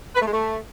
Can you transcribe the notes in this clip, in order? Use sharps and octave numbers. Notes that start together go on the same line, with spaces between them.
B4
A3
G#3
A3